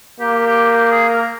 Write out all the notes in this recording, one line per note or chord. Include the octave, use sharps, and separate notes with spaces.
A#3 G4
G4
G4
G#4
A#4